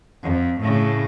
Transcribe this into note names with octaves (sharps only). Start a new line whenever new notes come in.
F2
A2 C#3